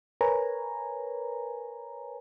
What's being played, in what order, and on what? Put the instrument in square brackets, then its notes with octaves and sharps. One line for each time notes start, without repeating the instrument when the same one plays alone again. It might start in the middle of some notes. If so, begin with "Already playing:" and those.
[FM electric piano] A#4 B4 C#5 G#5 A#5